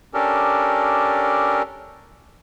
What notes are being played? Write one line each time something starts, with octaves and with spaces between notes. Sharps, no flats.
C#4 D4 G4 A4 A#4